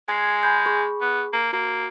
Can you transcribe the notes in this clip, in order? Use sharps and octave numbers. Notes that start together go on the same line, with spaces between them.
G#3 G#5 G#6 C7
G#5 B5 G6
G#4 B5 C#6
B3
A#3
A#3 F#4